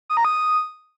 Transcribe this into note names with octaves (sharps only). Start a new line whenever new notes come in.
D#6
A#5
D#6